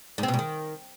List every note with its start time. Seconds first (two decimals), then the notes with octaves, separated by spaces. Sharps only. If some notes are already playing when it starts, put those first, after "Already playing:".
0.18 G#2
0.23 C4
0.28 B2
0.34 G#2
0.39 D#3